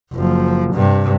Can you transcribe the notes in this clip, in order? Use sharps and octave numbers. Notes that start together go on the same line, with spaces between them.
F#1 F3
G2 C3